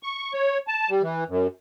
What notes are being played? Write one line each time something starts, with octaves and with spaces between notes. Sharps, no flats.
C#6
C#5
A5
G3
E3
F#2